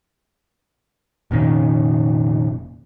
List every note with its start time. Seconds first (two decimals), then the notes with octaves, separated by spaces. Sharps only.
1.31 F1 A#2 D#3 C#4